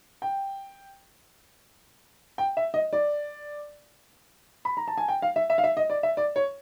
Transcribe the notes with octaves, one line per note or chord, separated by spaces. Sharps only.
G5
G5
E5
D#5
D5
B5
A#5
A5
G#5
G5
F5
E5
E5
F5
E5
D#5
D5
E5
D5
C#5